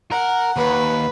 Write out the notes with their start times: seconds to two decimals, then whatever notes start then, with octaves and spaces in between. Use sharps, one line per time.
0.11 A#4 F#5
0.56 D#2 B4